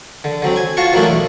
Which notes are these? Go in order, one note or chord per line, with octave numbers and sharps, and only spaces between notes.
D3
D3 F#3 C4
G#5
F4 F#4 F5 A5 C#6
E3 F#3 A3 A#3 D4 E4
B1